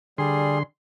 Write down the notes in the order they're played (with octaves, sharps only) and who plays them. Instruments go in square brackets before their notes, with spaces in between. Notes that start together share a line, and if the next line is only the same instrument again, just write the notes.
[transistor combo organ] D3 C6 [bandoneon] G3 G#4